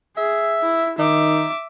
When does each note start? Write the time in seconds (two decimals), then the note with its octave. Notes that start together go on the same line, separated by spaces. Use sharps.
0.17 G#4 E5
0.62 E4
0.99 D#3 D#4 E5 D6